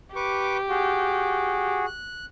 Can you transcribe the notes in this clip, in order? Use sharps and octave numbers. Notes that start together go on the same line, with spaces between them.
G4 B4 C#6 D6
F#4 G#4
F#6